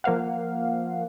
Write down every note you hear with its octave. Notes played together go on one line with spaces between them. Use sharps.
F3 A#3 C5 F5 F#5